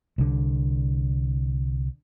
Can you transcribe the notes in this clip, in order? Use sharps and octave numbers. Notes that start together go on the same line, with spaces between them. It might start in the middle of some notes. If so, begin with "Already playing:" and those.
C2 D3